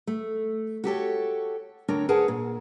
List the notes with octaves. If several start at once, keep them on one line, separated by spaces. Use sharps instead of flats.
A3
F#4 G4 A4 C#5
D2 C4 D4 A#4 C#5
G#4 A#4 B4 C#5 F#5 A5
A#2